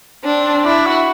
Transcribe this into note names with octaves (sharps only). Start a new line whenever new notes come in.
C4 D4
D4 E4
F#4